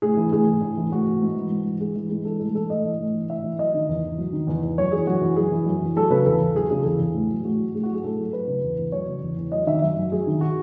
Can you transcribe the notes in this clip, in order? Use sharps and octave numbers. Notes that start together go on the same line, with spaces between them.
A2 G#4
E3
A2 G#4
E3
A2
E3
A2 F#4
E3
G#2
E3
G#2
E3
G#2 G#4
E3
G#2 G#4
E3 A4
A2 A4
E3 A4
A2 D#5
E3
A2
E3
A2 E5
E3
F#3 D#5
D#3
E2
E2
F#3
D#3
E2
E2
F#2 C#5
E3 G#4
F#2 F#4
E3
F#2 G#4
E3
F#2
E3
F#3 A4
C#3 B4
E2 A4
E2
F#3 G#4
C#3 G#4
A4
E2 G#4
E2
A2
F#3
A2 F#4
F#3
A2 G#4
F#4
F#3 G#4
A2 A4
F#3
F#3 B4
C#3
E2
E2
F#3 C#5
C#3
E2
E2
F#3 D#5
D#3 E5
F#2 E5
F#2
F#3 G#4
D#3
F#4